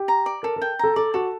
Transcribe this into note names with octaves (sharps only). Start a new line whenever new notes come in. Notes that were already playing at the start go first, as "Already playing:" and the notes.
Already playing: G4
A#5
D5
A4 A#4
A#4
G5
A4 A#5
A4 D5
F#4 A4